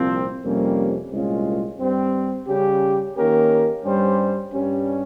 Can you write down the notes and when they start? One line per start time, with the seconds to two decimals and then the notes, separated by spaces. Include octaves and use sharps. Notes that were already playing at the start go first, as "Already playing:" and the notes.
Already playing: C2 A#2 F3 C4
0.42 F2 C3 G3 A#3 C#4
1.10 C2 A#2 G#3 C#4 F4
1.79 G2 G3 C4
2.47 C#3 G3 C#4 G4
3.16 D#3 A#3 C#4 G4 A#4
3.84 G2 G3 C#4 G4 C5
4.52 G2 G3 C#4